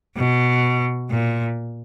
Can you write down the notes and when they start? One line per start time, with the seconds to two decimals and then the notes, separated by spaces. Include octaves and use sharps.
0.17 B2
1.10 A#2